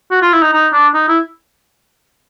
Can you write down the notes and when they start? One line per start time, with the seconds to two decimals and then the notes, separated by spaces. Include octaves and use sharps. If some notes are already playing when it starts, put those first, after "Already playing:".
0.11 F#4
0.22 F4
0.33 E4
0.42 D#4
0.53 D#4
0.73 D4
0.94 D#4
1.09 E4